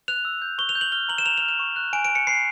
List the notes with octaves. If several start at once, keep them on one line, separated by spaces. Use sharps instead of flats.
F#6 F7
E6
G6
C#6 G7
F7
G6
F#7
F6 G7
A#5 F#7
E7
A#5 F7
F6 F7
E7
C#6
F#6
G#5 D7
G#5 D7
C#7
B5 C7